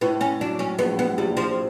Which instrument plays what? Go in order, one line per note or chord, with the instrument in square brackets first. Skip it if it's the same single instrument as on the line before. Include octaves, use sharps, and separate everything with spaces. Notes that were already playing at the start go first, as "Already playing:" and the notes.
[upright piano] A2 [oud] B3
[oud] C#4
[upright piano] F#3 [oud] D4
[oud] C#4
[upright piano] A#1 [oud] B3
[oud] B3
[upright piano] A#1 [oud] G3
[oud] F3